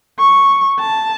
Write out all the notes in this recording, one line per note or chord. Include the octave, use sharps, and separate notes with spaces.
C#6
A5